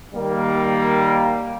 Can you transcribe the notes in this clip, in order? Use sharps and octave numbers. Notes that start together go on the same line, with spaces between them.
D#3 G3 A#3